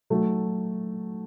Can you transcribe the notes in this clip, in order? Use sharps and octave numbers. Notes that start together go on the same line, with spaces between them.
F#3 A3